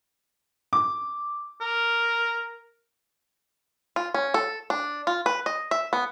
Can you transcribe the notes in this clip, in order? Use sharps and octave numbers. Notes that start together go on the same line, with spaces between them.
D6
A#4
F4
C#4
A4
D4
F4
B4
D#5
E5
B3